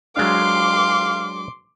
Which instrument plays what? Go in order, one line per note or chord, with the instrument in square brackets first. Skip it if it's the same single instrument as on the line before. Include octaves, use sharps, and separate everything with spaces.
[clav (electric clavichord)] F#3 G#3 D4 [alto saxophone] F5 [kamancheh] C6 D6